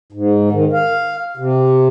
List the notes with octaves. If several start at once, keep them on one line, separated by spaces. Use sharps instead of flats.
G#2
D#3
F5
C3